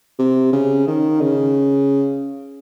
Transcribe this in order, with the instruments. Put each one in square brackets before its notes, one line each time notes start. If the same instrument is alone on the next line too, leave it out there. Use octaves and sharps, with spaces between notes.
[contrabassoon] C3
C#3
D#3
C#3